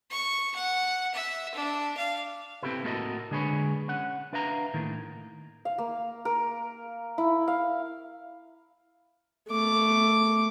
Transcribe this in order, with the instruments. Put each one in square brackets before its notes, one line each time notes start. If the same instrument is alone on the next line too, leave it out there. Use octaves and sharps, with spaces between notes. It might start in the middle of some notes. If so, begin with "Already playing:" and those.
[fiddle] C#6
F#5
E5
D4
F5
[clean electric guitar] C4 D4 E4 G4 A4 B4
A2 A#3 F#4 A4 A#4 D#5
D3 G#3 D4 G#4 B4 C#5
C#4 F#5
D4 B4 E5 F5 A5 A#5
A2 D#3 A#3
[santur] F5
A#3
A#4
E4
F5
[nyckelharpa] A3 D6